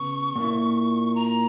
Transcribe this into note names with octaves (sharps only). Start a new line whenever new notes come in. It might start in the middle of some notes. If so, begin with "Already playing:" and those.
Already playing: C#3 B3 C#6
A#2 A#3 E4
A#5